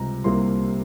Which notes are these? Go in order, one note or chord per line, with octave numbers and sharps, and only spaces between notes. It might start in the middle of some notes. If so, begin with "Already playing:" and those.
Already playing: C#2 C3 G3 A#5
C2 C3 G3 A#3 C6